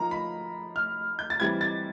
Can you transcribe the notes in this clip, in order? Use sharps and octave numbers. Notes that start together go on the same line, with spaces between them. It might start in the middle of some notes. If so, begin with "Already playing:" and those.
Already playing: F3 A#3 D#4 A#5
B5
F6
G6
A6
E3 G3 C4 E4 G#6
A6